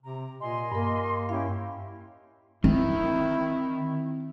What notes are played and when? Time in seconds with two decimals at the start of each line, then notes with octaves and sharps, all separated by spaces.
0.02 C3 A#5
0.39 A#2 D#5 G#5 C6
0.72 G2 A#3 A#4
1.29 C#4 E4 G4 F5
2.64 D#3 C4 E4